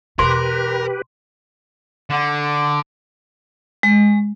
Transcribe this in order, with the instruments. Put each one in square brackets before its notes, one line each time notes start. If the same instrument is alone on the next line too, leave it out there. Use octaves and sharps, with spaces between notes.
[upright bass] E2 B2 [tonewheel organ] G4 B4 [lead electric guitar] A#4 [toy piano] C6
[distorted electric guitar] D3
[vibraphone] G#3